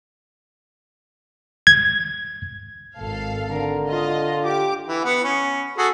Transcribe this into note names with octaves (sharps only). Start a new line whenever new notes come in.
G#6
G#1 A4 F5
D3 A#4
F4 D#5
G4 D6
E3
B3 F#5
C#4
F#4 G#4 A4